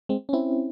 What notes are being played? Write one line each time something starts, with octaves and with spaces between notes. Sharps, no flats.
G#3 C4
C#4
C4 E4